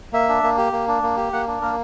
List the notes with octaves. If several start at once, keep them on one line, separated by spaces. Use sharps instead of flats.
A#3 E5
D4
A#3
G4
A#3
D4
A#3
G4
A#3 F#5
D4
A#3 A#4